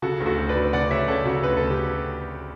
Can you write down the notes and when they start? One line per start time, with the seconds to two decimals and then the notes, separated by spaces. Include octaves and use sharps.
0.02 C#3 F#4 A4
0.20 D2
0.26 F#4 A4
0.38 D2
0.49 B4 D5
0.55 D2
0.73 C#3 D5 F#5
0.91 C#3 C#5 E5
1.08 C#3 A4 C#5
1.25 C#3 F#4 A4
1.43 D2 B4
1.57 C#3 A4
1.70 G4